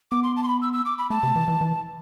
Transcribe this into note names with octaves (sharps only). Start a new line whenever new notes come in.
B3 D6
C6
A5
C6
B5
E6
E6
D6
B5
A3 A5
C3
E3
E3
E3